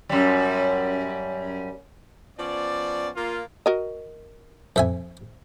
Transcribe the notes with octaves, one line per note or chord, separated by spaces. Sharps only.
F#2 G3
F3 B3 C#4 D5
A#3 F4
F#4 A#4 D#5
F2 E5 G#5